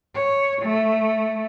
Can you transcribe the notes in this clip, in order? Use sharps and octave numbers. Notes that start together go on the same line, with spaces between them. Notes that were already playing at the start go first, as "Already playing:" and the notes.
C#5
A3